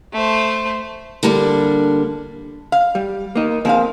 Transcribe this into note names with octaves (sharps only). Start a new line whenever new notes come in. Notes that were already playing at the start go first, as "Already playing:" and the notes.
A3 C5
D3 G3 A#3 D4
F5
G3
A#3 D#4
F3 A#3 C4 G#4 F5